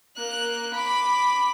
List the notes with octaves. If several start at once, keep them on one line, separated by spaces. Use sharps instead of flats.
A#3 F#6
B5 D6